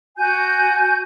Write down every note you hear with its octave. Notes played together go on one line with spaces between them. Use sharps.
F#4 G#5 G6